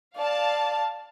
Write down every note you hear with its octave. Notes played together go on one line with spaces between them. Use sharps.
D5 F5 A5